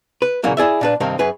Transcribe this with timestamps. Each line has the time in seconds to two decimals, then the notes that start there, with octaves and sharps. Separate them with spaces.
0.22 B4
0.43 A#2 C#3 E3 F#3 A#3 B3
0.57 E4 G#4 D5 E5
0.81 A#2 D4 B4
1.00 G2 C3 D#3 A#3 C4
1.19 F#2 G#4 B4